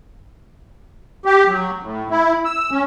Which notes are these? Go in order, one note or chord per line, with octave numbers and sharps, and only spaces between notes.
G4
F#3
A2
E4
E6
C#4